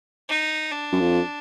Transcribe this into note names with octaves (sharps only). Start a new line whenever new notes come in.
D#4
D4
F#2
F2